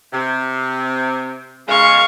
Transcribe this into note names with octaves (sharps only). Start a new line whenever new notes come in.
C3
C#3 G#3 F5 C#6